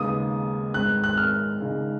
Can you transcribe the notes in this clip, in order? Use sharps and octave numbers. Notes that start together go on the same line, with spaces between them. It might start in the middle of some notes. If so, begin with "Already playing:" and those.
Already playing: D#2 C#3 G#3 B3 D#6
G#2 D#3 G#3 B3 F#6
F#6
F6
C#3 G#3 D#4